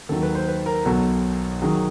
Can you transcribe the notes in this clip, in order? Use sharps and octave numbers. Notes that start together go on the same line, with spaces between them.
D#2 D#3 F#3 A4
B4
C5
B4
A#4
B1 B2 F#3 A4
D#3 F#3 G#4